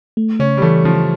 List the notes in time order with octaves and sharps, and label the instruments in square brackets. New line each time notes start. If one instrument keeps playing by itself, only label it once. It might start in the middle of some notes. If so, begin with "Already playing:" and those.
[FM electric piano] A3
[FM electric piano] C#3 [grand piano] C#4
[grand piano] G3
[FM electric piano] E3 [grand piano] A3
[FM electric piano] C#3 [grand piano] F3